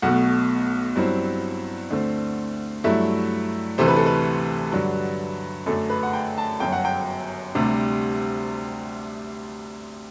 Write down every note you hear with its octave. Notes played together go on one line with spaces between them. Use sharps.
B1 B2 A3 F#5
G2 F#3 C4 E4
D2 D3 A3 C4
G2 F#3 A3 E4 E5
D2 C3 E3 A3 C5
B4
A4
B4
G2 D3 F#3
F#2 D3 A3 D4 A4
B4
F#5
G5
A5
G1 F#2 F#3 G5
F#5
G5
D2 C3 G3 D4